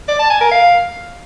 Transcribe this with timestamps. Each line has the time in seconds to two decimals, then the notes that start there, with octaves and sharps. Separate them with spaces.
0.09 D5
0.19 A5
0.30 G#5
0.41 A#4
0.52 F5